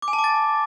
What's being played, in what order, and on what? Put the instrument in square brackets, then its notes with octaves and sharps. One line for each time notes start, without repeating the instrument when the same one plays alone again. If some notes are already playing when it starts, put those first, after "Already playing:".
[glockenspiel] D6
G#5
A5
D6
A6